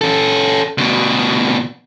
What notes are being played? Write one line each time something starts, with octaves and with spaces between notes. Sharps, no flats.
C#4 A4
D2 B2